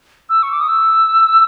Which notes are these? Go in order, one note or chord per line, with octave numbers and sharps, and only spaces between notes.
E6
C#6
D6
D#6
E6